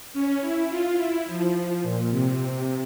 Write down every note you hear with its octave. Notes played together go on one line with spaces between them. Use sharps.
C#4
E4
F4
E4
F3
A#2
C3